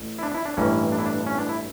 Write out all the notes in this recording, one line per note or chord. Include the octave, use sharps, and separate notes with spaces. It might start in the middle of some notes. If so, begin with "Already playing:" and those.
Already playing: A1
E4
D4
E4
D4
A1 G2 E3 A#3 C#4
D4
E4
D4
C#4
D4
E4